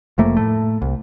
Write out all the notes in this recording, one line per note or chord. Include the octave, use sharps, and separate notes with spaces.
F1 F2 A3 A#3
A2 A3
C2